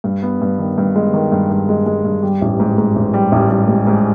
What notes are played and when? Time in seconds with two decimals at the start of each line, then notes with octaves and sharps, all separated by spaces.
0.04 G2
0.23 B3
0.42 G2
0.59 D#3
0.78 G2
0.96 G#3
1.14 D#3
1.32 G2
1.50 G2
1.69 G#3
1.86 G#3
2.04 G2
2.23 G3
2.42 A1
2.60 G#2
2.78 G#2
2.96 A1
3.14 G3
3.32 A1
3.50 G3
3.68 G#2
3.87 G#2